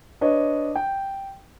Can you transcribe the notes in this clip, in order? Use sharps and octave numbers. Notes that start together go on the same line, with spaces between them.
D4 B4 C#5 D#5
G5